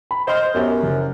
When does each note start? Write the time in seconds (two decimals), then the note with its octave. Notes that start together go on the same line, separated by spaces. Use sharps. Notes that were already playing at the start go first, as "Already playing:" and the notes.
0.11 B5
0.28 C5 D#5 F6
0.54 F#2 B3 G4 A#4
0.83 F#1